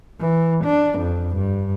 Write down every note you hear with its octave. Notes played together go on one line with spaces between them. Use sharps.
E3
D4
F2
G2